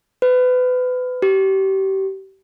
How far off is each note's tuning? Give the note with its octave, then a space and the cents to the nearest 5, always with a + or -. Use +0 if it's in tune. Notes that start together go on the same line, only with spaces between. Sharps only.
B4 +30
G4 -30